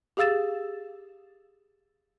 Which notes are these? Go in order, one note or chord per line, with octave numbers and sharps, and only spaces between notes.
G4 G#4 F5 E6 A6 E7